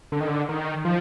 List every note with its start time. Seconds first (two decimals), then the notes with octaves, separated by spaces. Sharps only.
0.12 D3
0.20 D#3
0.28 D3
0.49 D#3
0.85 F3